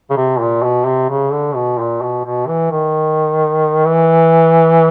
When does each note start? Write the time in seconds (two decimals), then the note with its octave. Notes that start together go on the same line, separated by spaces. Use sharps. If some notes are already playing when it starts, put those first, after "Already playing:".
0.10 C#3
0.17 C3
0.40 A#2
0.62 B2
0.86 C3
1.10 C#3
1.32 D3
1.55 B2
1.78 A#2
2.02 B2
2.24 B2
2.47 E3
2.71 D#3
3.85 E3